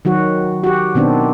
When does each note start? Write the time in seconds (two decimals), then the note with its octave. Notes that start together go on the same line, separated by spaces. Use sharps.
0.05 D#3 F#3 F#4
0.64 F#4 G4
0.95 B2 D#3 B3 C4 D4